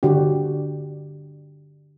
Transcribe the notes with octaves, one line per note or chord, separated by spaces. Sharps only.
D3 D4 F#4 G4